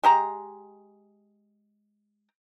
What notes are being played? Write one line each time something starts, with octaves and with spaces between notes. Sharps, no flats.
G#3 G4 A#5